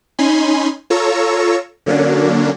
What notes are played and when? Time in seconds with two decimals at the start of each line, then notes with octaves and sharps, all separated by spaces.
0.19 C#4 D#4 G#5 B5 C6
0.90 F4 A4 C#5 A#5 C#6 E6
1.86 D3 F#3 A#3 C#4 D4